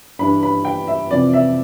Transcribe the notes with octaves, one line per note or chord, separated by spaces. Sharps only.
G2 E3 G3 D4 B5
B5
G5
E5
F2 C3 E3 D5
E5